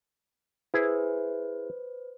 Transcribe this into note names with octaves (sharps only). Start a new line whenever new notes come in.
E4 G#4 B4 C5